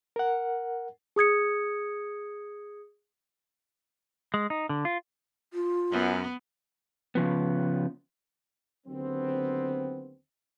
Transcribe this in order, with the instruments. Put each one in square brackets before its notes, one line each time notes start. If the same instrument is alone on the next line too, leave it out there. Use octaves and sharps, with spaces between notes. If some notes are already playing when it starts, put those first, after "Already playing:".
[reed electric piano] A#4 F#5
[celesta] G#4 D#6 G#6 C#7
[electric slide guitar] G#3
D#4
D3
F4
[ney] F4
[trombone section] F#2 [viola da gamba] B3
[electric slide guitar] C#3 F3 B3
[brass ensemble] D#2 D3 F#3 B3 C4